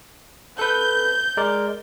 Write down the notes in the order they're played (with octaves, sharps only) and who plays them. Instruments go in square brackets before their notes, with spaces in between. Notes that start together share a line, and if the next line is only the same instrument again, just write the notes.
[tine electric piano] A4 B4 [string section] G6
[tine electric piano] G#3 A#4 D5